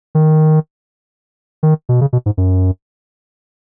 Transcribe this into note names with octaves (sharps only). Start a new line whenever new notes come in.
D#3
D#3
B2
C#3
B2
G#2
F#2